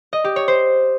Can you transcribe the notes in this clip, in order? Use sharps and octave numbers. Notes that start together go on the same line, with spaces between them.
D#5
G4
C#5
C5